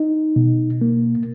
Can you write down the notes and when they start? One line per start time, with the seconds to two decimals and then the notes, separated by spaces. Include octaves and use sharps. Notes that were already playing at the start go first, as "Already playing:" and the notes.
Already playing: D#4
0.36 B2
0.81 A#3